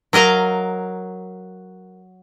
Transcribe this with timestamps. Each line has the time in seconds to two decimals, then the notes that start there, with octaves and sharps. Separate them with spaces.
0.13 F#3 A#4 D#5 F5 A#5